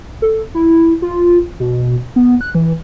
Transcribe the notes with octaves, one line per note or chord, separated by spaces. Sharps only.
A4
E4
F4
B2
B3
F#6
E3